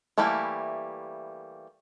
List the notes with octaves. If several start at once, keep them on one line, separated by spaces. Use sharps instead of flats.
E3 G3 A3 A#3 E4